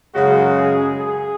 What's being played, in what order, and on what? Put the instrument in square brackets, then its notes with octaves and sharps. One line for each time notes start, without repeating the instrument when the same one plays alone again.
[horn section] F#2 C#3 G#3 [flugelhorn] F#4
[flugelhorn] G#4
G#4